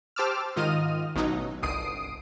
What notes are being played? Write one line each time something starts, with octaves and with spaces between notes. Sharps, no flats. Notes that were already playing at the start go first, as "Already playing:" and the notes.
G4 C5 A5 D6 E6 F6
G#2 D#3 F4 D#5 F6 D#7
A1 B2 F#3 D#4
G1 C2 D#6 C7 D7 D#7